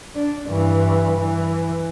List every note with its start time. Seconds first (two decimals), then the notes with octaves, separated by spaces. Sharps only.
0.15 D4
0.47 G2 E3
1.20 E3